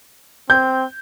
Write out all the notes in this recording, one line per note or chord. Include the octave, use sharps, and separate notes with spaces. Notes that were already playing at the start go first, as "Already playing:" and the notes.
C4 G6